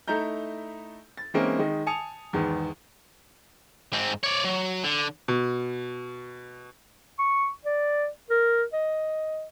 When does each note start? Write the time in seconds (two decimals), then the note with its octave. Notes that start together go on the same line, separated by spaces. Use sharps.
0.08 A3 D#4 E4 A#5 G6
1.17 A6
1.34 E3 G#3 A#3 C4 C#4 D#4
1.59 D#3 G#3 D#4
1.87 G#5 A5 D#6 C#7 F7
2.33 E2 G#2 D#3 B3
3.93 G#2 C4
4.24 C#5 D5
4.44 F#3
4.83 D3
5.28 B2
7.19 C#6
7.65 D5
8.30 A#4
8.73 D#5